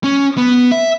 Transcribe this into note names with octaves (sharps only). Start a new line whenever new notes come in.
C#4
B3
E5